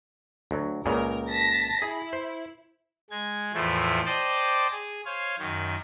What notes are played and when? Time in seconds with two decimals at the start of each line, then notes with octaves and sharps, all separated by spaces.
0.51 D2 F#3
0.86 C#2 A#2 C#3 A#4
1.30 A5 A#6 B6
1.82 E4 G#4
2.13 C5
3.10 G#3 G#6
3.54 E2 A2 F3 A3
4.05 C5 D5 D#5 G5 A5 D6
4.71 G#4
5.06 C5 C#5 F5 G#5
5.39 F#2 D#3